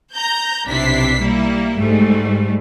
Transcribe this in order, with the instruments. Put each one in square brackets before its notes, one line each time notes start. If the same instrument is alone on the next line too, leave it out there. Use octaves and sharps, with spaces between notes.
[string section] A#5 G6
B1 C3 D4 E4 B6 C7
G3 A#3 E4
G#2 G3 A3